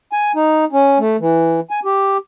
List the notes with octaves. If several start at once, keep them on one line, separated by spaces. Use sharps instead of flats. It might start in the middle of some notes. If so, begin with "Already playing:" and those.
G#5
D#4
C#4
A3
E3
G#5
G4